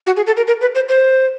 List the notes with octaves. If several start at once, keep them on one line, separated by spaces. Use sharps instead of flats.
F#4
G#4
A4
A#4
A#4
B4
C5
C5